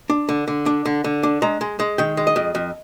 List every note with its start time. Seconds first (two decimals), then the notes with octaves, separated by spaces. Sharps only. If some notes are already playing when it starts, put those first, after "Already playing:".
0.10 D4
0.29 D3
0.48 D3
0.66 D4
0.86 D3
1.04 D3
1.23 D4
1.42 G#3 A#5
1.61 G#3
1.80 G#3
1.98 D#3 G5
2.17 G#3
2.27 D#5
2.36 F2
2.55 F2